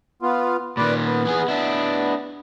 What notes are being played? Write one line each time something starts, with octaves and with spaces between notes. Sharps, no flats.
B3 F4
A#2 D#3 B4 D5
B3
E3 G#4
D4 E4